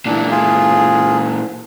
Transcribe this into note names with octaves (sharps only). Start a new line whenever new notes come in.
A#2 E3 D4
F4 G#4